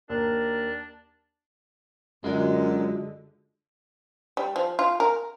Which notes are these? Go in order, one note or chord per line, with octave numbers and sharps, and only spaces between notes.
D#2 D4 A#4
F#2 D3 G#3 F4 F#4 D5
G3
F3
F4
A#4